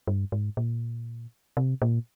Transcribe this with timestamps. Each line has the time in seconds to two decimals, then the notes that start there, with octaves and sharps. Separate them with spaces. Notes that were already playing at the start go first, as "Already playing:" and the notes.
0.07 G2
0.32 G#2
0.57 A#2
1.57 C3
1.82 A#2